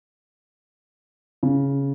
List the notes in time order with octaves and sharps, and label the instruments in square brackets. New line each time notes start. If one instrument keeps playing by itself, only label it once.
[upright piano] C#3